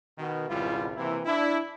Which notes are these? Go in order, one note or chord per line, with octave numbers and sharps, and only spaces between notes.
B2 D#3
G#1 C#2 B2 G3 E4 F4
C3 E3 A#3 E4
D4 E4